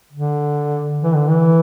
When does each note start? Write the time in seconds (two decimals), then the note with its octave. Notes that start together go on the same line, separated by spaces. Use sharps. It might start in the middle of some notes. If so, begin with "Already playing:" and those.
0.13 D3
1.03 E3
1.16 D3
1.29 E3